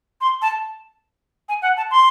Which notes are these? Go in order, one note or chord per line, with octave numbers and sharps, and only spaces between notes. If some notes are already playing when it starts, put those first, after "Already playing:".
C6
A5
G#5
F#5
A5
C6